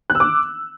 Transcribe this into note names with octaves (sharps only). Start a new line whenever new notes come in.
F#6
E6
D6